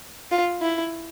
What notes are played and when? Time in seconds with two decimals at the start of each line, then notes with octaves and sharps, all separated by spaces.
0.31 F4
0.62 E4